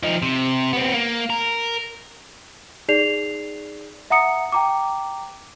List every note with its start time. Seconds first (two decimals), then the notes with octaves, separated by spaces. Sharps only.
0.03 F3 D#4
0.22 C3
0.73 B3 C4
0.94 A#3
1.30 A#4
2.88 D#4 G#4 D5 C7 F7
4.10 E5 F#5 A#5 D#6 C#7
4.52 G5 A#5 D6